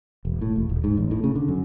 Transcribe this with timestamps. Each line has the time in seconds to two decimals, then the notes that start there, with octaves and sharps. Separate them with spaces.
0.25 E1
0.41 A2
0.56 E1
0.69 D#1
0.84 G#2
0.97 A1
1.11 A2
1.24 C#3
1.35 D3
1.48 F#2